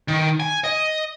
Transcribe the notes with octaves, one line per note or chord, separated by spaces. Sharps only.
D#3
G#5
D#5